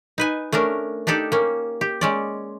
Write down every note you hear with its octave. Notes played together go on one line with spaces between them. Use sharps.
D#4 B4 G#5
A3 C#4 D4 A#4
D4 D#4 G4 A4 D5
A#3 C#4
G4
G#3 C#4 D5